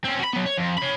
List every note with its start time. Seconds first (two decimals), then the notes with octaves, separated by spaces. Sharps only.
0.05 C4 C#4
0.20 F#4 B5
0.33 F#3 B3
0.46 C#5
0.57 F2
0.78 C#5 B5